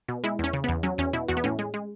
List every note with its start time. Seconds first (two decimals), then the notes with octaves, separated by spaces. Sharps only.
0.08 B2
0.24 G#3 E4
0.39 E2 C#4
0.53 C#3
0.64 E2 B3
0.83 F#3 C#4
0.98 E2 C#4
1.13 B2 E4
1.28 E2 F#4
1.37 B3
1.44 A2 C#4
1.59 G#3
1.74 G#3